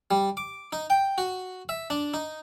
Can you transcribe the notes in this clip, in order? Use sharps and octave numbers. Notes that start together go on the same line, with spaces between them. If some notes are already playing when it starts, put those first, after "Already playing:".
G3
D6
D#4
G5
F#4
E5
D4
D#4